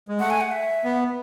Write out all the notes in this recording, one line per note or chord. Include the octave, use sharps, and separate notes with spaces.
G#3
A3 F#5
G#5
F#5
E5
B3